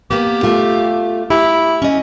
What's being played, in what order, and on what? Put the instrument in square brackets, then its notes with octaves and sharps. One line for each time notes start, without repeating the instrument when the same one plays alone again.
[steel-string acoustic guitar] A#3 B3 [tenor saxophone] G4
[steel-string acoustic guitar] A3 F4
[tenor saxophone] E4 [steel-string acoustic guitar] G4
[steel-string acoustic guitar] C#4 D#5